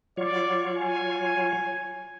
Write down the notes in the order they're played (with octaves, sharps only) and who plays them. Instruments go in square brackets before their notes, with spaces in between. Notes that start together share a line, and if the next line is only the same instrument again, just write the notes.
[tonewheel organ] F#3 F4 C#5 [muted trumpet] D5
[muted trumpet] G#5